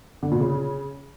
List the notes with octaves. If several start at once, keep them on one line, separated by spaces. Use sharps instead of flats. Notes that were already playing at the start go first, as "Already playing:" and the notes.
D3
A#2
C#3